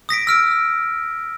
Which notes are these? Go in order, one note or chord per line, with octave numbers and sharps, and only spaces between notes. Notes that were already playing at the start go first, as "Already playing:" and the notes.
D#6 A#6 B6 D7
E6 F6 D7